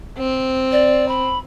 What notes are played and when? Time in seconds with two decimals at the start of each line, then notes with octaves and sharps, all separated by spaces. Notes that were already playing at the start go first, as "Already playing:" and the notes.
0.17 C4
0.72 D5
1.08 B5